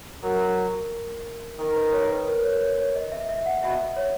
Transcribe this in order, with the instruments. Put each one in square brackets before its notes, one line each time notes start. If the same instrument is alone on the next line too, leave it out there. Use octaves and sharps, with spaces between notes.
[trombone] F#3 [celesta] A#4
[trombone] D#3 [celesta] A#4
[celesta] B4
C#5
B4
A#4
C#5
C#5
C#5
D#5
E5
E5
F#5
[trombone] B2 [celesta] E5
[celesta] C#5